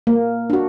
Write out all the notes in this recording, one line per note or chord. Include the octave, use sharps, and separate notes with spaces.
A#3
D4 F#4